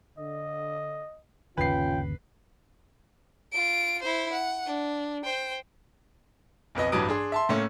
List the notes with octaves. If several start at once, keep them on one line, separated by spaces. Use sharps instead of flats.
D3 D#5
G1 D#2 C#3 C#4 F4 B4 G5 C7
F4 D7
E4 C5
F#5
D4
C5 G5
B1 F2 B4 D#5
A1 G2 E3 F#3 D#6 D7
D4 G#4 C6
E5 A5 C6
A2 A3 A#3 C#4